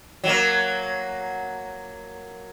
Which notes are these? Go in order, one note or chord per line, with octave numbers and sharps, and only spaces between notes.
F#3 A#3